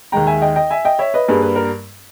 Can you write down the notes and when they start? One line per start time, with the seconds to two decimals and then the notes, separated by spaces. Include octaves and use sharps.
0.12 D#2 D#3 G#3 G5 A#5
0.27 E5 G#5
0.42 D#5 G5
0.56 D#5 G5
0.70 E5 G#5
0.85 D#5 G5
0.99 C#5 E5
1.14 B4 D#5
1.28 G2 G3 A#3 G#4 B4
1.42 B4
1.56 A#4